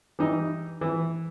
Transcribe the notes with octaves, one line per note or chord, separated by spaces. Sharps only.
E3 G3 D#4 A#5
E3